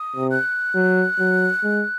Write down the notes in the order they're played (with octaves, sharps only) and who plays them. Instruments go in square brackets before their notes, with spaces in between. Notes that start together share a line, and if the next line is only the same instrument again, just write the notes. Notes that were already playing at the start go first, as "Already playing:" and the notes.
Already playing: [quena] D#6
[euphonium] C3
[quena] F#6
[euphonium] F#3
F#3
G#3